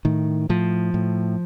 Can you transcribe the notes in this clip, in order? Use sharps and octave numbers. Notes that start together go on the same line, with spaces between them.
A2 D#3
A2 F3
A2